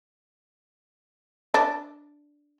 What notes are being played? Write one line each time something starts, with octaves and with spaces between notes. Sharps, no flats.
D4